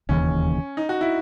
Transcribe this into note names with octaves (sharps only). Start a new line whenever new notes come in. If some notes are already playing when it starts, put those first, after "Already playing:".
E1 D#2 C#3 E3 C#4
D#4
F#4
E4